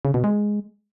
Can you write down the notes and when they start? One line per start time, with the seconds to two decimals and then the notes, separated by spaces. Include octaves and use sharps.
0.05 C#3
0.14 B2
0.24 G#3